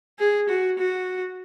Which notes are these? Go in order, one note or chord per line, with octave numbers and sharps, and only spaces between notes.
G#4
F#4
F#4